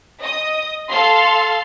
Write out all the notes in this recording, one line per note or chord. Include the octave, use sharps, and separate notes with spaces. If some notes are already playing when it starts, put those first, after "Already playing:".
D#5 D#6
A4 F5 C6